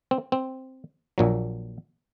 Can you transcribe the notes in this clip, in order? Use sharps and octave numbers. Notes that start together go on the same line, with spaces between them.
C4
C4
A#1 A#2 F#3